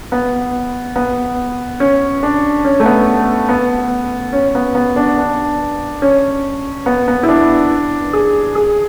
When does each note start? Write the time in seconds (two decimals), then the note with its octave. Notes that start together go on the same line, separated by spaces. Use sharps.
0.12 B3
0.96 B3
1.80 C#4
2.23 D4
2.65 C#4
2.80 A3
2.85 B3
3.49 B3
4.33 C#4
4.55 B3
4.75 B3
4.96 D4
5.18 D4
6.02 C#4
6.86 B3
7.08 B3
7.23 E4
7.28 D4
8.13 G#4
8.55 G#4